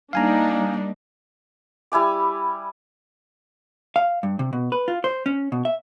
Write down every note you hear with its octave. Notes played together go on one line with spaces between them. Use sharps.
G3 A#3 D4 D#4 F5 G#5 A#5
G3 E4 G#5 D6
F5
G2
C3
B2
B4
F4
C5
C#4
B2
E5